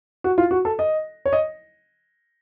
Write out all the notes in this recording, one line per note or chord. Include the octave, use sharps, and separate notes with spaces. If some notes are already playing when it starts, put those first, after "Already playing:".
F#4
F4
F#4
A4
D#5
C#5
D#5